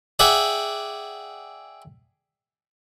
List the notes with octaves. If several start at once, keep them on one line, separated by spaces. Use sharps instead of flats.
G#4 D5 E5 F#5 G5